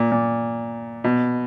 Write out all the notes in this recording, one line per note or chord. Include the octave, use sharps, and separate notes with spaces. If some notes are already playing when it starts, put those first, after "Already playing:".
Already playing: A#2
A#2
B2